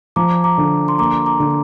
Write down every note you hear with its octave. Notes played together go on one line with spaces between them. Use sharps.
F3 A#5 D6
A#5 D6
D3
C6
A#3 A#5 D6
A#5 D6
D3